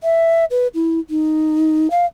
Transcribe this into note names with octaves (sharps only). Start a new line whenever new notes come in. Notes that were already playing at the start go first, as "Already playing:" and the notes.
E5
B4
E4
D#4
F5